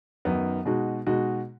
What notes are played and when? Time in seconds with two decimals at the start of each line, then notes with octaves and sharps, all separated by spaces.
0.25 F#2 D#3 B3 D#4
0.66 B2 G#3 D#4 F#4
1.06 B2 G#3 D#4 F#4